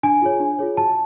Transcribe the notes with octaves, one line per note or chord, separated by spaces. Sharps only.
D4 G#5
F4 G#4 C#5
D4
F4 G#4 C#5
F#4 A5